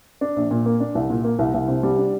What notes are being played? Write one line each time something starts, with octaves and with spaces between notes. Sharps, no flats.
D4
A#1
A#2
A#3
D4
C2
A#2
A#3
C2
C2
C3
G3
D4